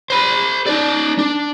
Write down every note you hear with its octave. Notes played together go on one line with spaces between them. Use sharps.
C5 B5
D#4 D5
D4